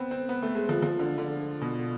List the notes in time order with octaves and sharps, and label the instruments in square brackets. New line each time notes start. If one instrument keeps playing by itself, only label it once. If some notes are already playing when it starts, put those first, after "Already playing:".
Already playing: [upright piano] B3 C4
C4
B3
A3
G#3
F3
F3
D3
D3
B2